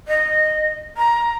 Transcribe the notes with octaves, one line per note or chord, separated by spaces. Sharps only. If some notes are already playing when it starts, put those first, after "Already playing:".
D#5
A#5